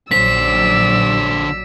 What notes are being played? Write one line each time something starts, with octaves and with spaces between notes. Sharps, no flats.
A#1 D3 F#3 C5 D5 E6 B6